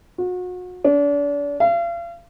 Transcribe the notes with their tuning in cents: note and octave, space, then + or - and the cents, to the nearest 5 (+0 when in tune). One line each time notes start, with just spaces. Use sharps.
F#4 -35
D4 -35
F5 -40